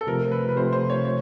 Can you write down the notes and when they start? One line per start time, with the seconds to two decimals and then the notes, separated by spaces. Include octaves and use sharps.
0.01 A4
0.07 C3 F3 A3 A#4
0.32 B4
0.49 B4
0.56 C3 F3 A3 C5
0.73 C5
0.90 C#5
1.05 C#5